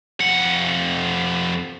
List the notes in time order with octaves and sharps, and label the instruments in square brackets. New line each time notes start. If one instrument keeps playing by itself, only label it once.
[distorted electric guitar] F2 F#5